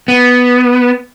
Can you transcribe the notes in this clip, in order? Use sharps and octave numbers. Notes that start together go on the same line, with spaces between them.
B3